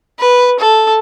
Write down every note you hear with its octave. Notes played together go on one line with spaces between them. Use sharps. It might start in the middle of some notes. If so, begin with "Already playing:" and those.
B4
A4